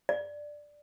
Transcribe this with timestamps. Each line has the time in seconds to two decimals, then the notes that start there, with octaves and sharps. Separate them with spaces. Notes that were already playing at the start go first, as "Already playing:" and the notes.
0.09 D5